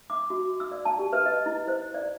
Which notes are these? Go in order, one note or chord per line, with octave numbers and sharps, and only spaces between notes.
D6
F#4
E6
D5
A5
G4
B4
D#5
E4
C5
D5